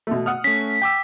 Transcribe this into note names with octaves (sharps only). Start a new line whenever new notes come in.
B2 A3
F#5 D#6 F6
A3 C#4 B6
G5 D6 E6